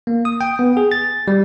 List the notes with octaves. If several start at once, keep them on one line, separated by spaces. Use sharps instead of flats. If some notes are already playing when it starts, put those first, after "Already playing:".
A#3
D#6
G5
B3
G#4
A6
G3